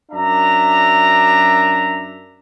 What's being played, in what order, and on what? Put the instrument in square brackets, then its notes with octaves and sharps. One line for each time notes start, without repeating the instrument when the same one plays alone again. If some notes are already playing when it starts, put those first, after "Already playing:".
[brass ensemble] F#2 D4 E5 A#5